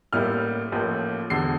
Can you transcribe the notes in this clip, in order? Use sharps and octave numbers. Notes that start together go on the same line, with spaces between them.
A1 A2 G3 A#3 E4 F6
A1 A2 F3 A#3
E1 E2 D3 C7